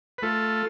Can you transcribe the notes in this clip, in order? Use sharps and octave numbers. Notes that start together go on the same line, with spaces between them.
B4
A3 F4 A4